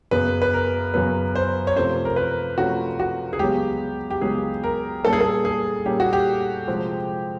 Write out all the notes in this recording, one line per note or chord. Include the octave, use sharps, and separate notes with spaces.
F#2 C#3 F#3 B3 B4
B4
A#4
F#2 C#3 F#3 B3 B4
C5
C#5
C3 F3 A3 C#4 C5
A#4
B4
C3 F3 A3 C#4 F#4
F#4
G#4
C#2 C#3 F#3 B3 G4
G4
C#2 C#3 F#3 B3 G#4
A#4
A#2 G3 A#3 C#4 A4
G#4
A4
G#4
A#2 G3 A#3 C#4 G4
F#4
G4
C3 F3 G#3 C4